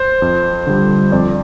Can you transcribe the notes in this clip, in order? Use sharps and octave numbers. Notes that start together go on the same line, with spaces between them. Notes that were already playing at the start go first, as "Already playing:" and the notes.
Already playing: C5
F2
D3 G3
F2 D5